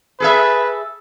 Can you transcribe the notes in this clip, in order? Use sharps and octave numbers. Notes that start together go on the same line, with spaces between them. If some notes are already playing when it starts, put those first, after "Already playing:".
G#4 A4 B4 E5